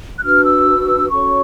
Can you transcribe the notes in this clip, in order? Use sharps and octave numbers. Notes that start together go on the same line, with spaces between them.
F#6
D4 F#4 B4 F6
E6
C#4 F#4 A4 C#5 C#6